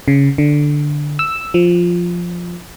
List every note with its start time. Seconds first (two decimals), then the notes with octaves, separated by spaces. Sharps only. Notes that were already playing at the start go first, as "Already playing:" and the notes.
0.08 C#3
0.38 D3
1.19 E6
1.54 F3